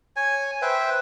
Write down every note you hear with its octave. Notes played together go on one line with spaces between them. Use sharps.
C#5 G#5
B4 C5 E5 G5